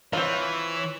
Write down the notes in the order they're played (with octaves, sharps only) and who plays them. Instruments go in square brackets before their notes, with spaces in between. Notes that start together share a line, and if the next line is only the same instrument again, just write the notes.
[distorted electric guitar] E3 [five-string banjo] C4 F4 [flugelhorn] C#5